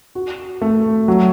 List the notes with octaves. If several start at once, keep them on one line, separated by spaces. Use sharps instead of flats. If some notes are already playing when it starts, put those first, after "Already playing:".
F#4
A3
F#3